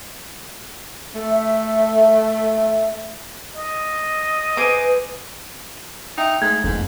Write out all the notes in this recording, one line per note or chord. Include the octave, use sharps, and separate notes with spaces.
A3
E5
D#5
G#4 B4 C5 D6
D#4 E5 G5 D#6
G#2 A3 G#6
F#1 F2 G#2 B3